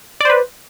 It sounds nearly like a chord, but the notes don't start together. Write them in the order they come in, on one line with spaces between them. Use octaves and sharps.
D5 C5 B4